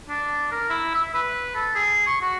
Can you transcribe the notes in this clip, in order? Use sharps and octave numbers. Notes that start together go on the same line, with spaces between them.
D4
A#4
E4
E5
B4
A4
G#4
C#6
F#4